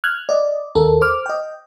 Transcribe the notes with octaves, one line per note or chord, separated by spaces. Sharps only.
F6 F#6 G#6
D5 D#5
D#2 A4 A#4
C5 D6 F6
D#5 G5